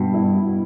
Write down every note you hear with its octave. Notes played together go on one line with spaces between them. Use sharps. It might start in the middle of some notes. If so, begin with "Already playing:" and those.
Already playing: G2 B2
E4
B2